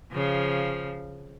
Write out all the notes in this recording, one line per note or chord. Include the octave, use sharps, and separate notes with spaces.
C#3 F3